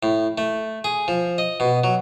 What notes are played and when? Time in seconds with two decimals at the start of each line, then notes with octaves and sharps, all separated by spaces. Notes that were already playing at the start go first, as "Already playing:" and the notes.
0.03 A2
0.38 A3
0.84 G#4
1.08 F3
1.38 D#5
1.60 B2
1.84 F#3